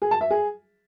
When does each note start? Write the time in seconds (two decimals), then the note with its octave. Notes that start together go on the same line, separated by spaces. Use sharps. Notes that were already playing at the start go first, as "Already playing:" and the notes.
0.02 G#4
0.11 A5
0.21 E5
0.30 G#4